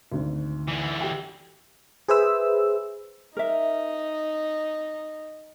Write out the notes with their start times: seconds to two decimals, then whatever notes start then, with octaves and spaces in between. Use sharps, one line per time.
0.12 G#1 D2
0.68 D3 E3
1.01 G4 G5
2.09 G#4 B4 C5 E5 E6
3.37 D#4 A#4 E5